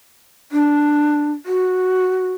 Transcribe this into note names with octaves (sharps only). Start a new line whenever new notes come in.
D4
F#4